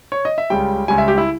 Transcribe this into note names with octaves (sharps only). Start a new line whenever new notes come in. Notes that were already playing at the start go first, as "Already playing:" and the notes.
C#5
D#5
E5
C#2 C#3 G3 G5
C#2 C#3 G3 G#5
E5
G4
E4